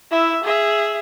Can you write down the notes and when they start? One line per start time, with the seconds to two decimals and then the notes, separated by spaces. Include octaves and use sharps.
0.11 E4 E5
0.44 G#4 E5